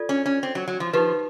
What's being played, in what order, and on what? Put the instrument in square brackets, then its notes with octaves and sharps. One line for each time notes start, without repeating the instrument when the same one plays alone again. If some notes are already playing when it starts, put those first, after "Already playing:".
Already playing: [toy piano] F4 A4 D5
[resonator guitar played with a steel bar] C#4
C#4
C4
F#3
F#3
F3
[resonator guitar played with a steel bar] F3 [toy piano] D#4 G4 B4